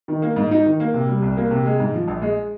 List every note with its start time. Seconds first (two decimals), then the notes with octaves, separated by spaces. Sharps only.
0.08 D#3
0.22 A#3
0.36 G#2
0.51 D#4
0.66 D#3
0.80 A#3
0.94 C3
1.08 G3
1.22 C2
1.37 A#3
1.51 C3
1.66 G#3
1.80 G#2
1.94 F3
2.08 A#1
2.22 G#3